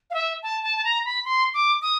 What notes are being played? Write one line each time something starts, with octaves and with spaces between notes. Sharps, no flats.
F5
E5
A5
A5
A5
A#5
B5
C6
D6
D#6